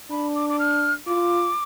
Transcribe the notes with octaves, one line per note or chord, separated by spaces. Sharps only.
D4 B5
D6
D6
F6
F4 D6